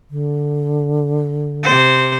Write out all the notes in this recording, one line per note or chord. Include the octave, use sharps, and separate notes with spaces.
D3
C3 C5